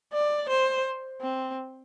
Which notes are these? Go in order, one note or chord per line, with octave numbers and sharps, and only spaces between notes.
D5
C5
C4